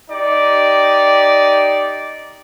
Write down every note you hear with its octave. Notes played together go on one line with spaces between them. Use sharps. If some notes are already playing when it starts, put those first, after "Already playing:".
D#4 G4 D5